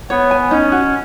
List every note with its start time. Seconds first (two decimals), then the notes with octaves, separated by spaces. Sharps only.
0.10 B3 C#5
0.31 G#5
0.51 C#4 D#4
0.72 F#4